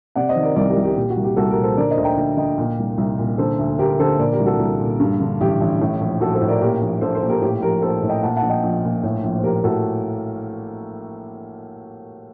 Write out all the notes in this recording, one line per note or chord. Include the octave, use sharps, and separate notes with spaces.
C3 D5 F#5
C5 D#5
D#3
A#4 D5
C2 A#4 D5
G4 A#4
C2
G4
A#2 G4
F#4
C2
G4
C2 F#4 A4
G4 A#4
A#2
A4 C5
D3 A#4 D5
C5 D#5
D2
G5 A#5
D2
D3 D#5 G5
A#2
C2
C2
A#2
D3 A4 C5
D2
D2 G4 A#4
D3 A4 C5
A#2 A#4 D5
G4 A#4
C2
F#4 A4
C2
A#2
G2
D3
A1 G4
A1
A2
A#1
A#1 F#4 A4
A4 C5
A2
A#4 D5
A#2 G4 A#4
A#1
A#1 A4 C5
A4 C5
A#2
G4 A#4
A2 G4
A#1 G4 A#4
A#1 A4 C5
A2
D#5 G5
A#2 F#5 A5
F#5 A5
A#1
D#5 G5
A#1
A#2
A2
A#1
C5
A#1 G4 A#4
A2 F#4 A4